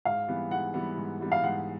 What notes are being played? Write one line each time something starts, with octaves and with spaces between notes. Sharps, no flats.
G#2 F5
E3 G3 B3
G#2 F#5
E3 G3 B3
G#2
E3 G3 B3
F5
G#2 F#5